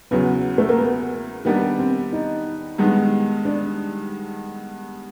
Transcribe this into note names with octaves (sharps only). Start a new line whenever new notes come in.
E2 C#3 F#3 B3
A3
A#3
B3
D#3 G3 A#3 B3 D4
C4
D#4
G2 D#3 G#3 B3
D4